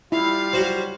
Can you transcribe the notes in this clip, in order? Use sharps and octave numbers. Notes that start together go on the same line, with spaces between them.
G3 E4 F4 F5
F#3 F#4 C5